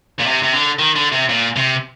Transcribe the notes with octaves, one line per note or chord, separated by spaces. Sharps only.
A#2
C3
C3
D3
D#3
D3
C3
A#2
C3